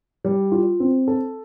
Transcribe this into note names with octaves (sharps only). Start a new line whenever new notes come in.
G3
F4
C4
A4